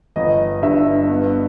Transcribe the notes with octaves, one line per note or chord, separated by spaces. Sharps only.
G1 D#5
G2 E5
B3